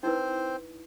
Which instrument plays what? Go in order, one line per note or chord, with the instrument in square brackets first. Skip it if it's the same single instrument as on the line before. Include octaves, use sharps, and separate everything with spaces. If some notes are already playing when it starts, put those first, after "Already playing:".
[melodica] C4 C5 [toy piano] D#4 E4 B4